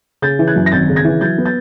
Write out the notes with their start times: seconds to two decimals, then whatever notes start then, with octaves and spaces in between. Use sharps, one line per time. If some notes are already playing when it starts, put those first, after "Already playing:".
0.22 C#3 G6 A6
0.39 E3
0.47 F#6 G#6
0.56 F#2
0.66 A#6
0.72 G#1 G6 A6
0.89 C#3
0.96 G#6 A#6
1.05 E3
1.21 F#3 G6 A6
1.38 B3
1.46 G6 A6